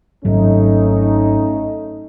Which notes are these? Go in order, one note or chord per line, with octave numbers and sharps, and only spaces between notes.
G#1 G#2 F#3 A3 C#4 D#4